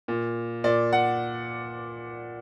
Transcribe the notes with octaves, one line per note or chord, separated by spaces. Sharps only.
A#2
A#2 D5
F#5